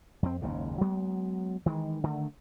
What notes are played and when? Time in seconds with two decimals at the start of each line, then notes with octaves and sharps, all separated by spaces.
0.22 F2 C4
0.42 F#1 D#2 G#2 C#3
0.81 F#3 G#3 B3
1.66 D#3 E3 G#3
2.04 D3 D#3 A3